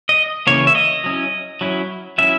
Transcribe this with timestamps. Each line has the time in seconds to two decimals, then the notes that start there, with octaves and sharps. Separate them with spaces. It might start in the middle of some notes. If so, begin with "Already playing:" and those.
0.09 D#5
0.47 C#3 E3 A#3 C#5
0.67 E5
0.75 D#5
1.04 F#3 C#4 E4
1.61 F#3 C#4 E4
2.18 F#3 C#4 E4 E5